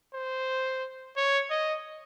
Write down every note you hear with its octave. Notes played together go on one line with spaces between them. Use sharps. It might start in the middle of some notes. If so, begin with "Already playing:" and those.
C5
C#5
D#5